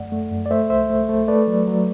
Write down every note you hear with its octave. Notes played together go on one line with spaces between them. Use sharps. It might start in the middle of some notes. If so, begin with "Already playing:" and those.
Already playing: F#2 A3 D5 F#5
A3
F#2
D5
A3 C5 E5
C2 C5 E5
A3
A3
A3 B4 D5
F#3
F#3